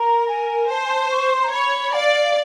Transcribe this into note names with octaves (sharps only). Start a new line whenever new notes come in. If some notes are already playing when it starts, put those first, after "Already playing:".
Already playing: A#4 A#5
G#5
C5 A5
G#5
A5
C#6
C6
A#5
C#5 B5
D5 F5